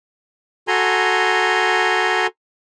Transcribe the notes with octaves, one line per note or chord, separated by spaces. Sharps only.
F#4 A4 G#5 A#5 C6